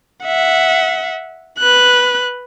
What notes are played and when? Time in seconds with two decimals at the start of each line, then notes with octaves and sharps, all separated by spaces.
0.25 E5 F#5
1.59 B4 F#6